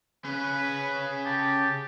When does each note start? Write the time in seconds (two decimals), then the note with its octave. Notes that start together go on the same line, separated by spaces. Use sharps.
0.25 C#3 C#4 B4
1.26 G4 A5